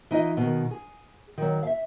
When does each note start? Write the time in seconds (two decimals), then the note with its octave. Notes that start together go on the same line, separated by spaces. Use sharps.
0.11 E3 D#4 F4 D#5
0.37 B2 D#3
0.71 G#4
1.38 D#3 F#3
1.63 E5 F5